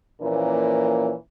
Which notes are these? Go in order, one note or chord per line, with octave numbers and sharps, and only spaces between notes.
A#2 E3 F3 A#3 C#4